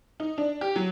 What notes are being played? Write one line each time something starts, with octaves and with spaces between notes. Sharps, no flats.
D#4
D4
G4
F#3